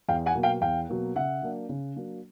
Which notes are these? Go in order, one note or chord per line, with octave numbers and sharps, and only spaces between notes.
E2 F5 G5
F#5 G#5
B2 F#3 A#3
F5 G5
E2 F5 G5
B2 F#3 A#3
C#3 E5 F#5
F#3 A#3 D4
C#3
F#3 A#3 D4